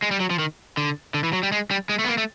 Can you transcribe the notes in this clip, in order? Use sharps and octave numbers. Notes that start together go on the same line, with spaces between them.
G#3
G3
F#3
F3
D#3
D3
D3
E3
F#3
G3
G#3
G3
G#3
A3
B3
A#3
A3